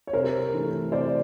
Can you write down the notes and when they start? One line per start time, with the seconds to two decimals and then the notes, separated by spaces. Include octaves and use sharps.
0.07 C#5
0.13 C3 A#4 C5
0.54 E3 A3
0.92 C3 C5 D5